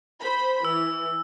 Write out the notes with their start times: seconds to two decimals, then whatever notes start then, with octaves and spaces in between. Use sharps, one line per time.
0.21 C5 B5
0.65 E3 E6